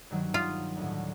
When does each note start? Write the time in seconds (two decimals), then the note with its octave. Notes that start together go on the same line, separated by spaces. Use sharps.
0.11 G2 D#3 F#3
0.34 F4 D#6
0.77 D2 A2